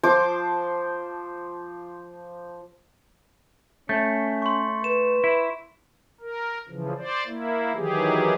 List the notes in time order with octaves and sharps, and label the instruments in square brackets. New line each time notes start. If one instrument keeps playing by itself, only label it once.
[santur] F3 C5 C6 D6
[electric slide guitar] A3 [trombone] C#4 [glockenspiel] G6
[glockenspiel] C6 C#6
[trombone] B4 [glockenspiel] E7
[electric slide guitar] E4
[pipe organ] A#4
C#3 E3 F3
C5 D5
A#3 E4
D#3 E3 F#3 G4 G#4